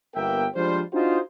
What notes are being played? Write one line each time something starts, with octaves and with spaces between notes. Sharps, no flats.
G1 A#3 B3 A#4 E5 G5
F3 G3 G#3 D4 F4 C5
D4 D#4 F4 F#4 G#4 C5